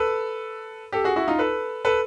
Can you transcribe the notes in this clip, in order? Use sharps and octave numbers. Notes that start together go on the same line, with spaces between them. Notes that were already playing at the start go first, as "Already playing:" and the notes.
Already playing: A4 B4
G4 A4
F#4 G#4
E4 F#4
D#4 F4
A4 B4
A4 B4